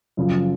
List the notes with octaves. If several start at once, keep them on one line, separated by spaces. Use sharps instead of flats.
F#2 C#3 F3